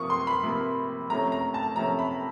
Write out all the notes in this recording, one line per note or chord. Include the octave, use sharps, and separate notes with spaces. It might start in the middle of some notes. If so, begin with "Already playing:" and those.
Already playing: C3 F3 A#3 C#6 D#6
C6
B5
C3 F3 A#3
C3 F3 A3 C#4 A#5
A#5
A5
C3 F3 A3 C#4 A#5
B5